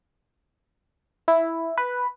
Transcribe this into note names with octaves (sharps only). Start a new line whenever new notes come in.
E4
B4